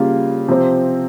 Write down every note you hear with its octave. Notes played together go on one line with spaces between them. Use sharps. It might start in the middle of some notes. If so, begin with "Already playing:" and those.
Already playing: C#3 G3 A#3 F4
C3 F3 C4